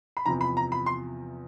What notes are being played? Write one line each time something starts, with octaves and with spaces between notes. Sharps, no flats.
B5
E2 C3 F3 A#5
B5
A#5
B5
C6